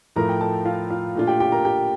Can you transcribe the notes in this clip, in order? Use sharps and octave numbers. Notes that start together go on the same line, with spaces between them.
A2 F3 A3 A#4 A#5
G5
A4 A5
F4 F5
F4 F5
A#2 A3 D4 F4
G4 G5
G4 G5
A#4 A#5
G4 G5